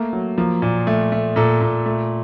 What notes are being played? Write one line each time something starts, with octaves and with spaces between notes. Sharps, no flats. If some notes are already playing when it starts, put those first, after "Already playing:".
Already playing: A3 A#3
F#3
F3 A#3
A#2
A3
A3
A#2 A4
A#2
A3